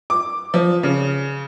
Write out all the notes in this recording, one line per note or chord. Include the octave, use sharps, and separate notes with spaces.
D6
F3
C#3